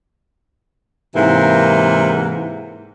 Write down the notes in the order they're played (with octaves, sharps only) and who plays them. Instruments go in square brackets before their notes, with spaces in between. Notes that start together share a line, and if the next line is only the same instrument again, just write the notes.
[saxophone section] G#2 C3 E3 A#3